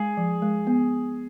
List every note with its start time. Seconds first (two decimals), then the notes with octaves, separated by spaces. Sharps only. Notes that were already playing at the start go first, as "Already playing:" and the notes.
Already playing: G#3 G#4
0.17 F3
0.42 G#3
0.67 B3